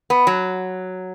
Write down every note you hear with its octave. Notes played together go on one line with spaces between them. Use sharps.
B3
F#3